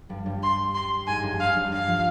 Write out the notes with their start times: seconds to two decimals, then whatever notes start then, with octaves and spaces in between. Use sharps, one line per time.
0.09 G2 G3
0.26 G2 G3
0.43 C6
0.74 C6
1.07 G#2 G#3 G#5
1.23 G2 G3
1.39 G2 G3 F5
1.56 G2 G3
1.72 G2 G3 F5
1.87 F3